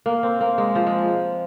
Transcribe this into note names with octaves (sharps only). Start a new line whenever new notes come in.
A#3
C4
A#3
G#3
F3
G#3